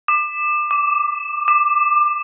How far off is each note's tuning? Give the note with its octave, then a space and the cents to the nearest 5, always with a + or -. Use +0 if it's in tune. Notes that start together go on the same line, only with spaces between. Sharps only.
D6 +30
D6 -5
D6 +25